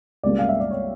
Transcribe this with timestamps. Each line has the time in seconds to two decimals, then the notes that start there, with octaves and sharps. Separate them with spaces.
0.23 C#2 C#3 G3 A#3 D5
0.39 F5
0.49 E5
0.60 D5
0.71 C#5